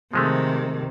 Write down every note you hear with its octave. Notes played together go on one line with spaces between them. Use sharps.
C3 D#3 F3 G#3 A3